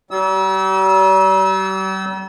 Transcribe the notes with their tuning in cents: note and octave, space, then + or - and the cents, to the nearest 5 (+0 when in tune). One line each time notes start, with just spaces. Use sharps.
G3 -40 E6 -25